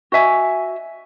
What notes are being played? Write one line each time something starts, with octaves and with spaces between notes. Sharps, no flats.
F#4 D#5 E5 G#5